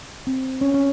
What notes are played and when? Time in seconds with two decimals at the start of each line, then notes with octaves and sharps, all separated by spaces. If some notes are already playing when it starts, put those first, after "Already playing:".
0.27 C4
0.61 C#4
0.74 C#4